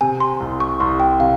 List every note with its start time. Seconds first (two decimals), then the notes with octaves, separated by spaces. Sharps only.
0.01 C3 G#5
0.20 C6
0.40 C2
0.60 C#6
0.80 C2 C6
1.00 G5
1.20 C3 F5